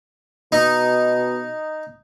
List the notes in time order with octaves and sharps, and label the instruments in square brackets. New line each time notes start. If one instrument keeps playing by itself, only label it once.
[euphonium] B2 [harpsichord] D#4